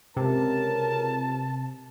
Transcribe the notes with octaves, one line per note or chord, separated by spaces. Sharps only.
C#2 C3 A#4 A5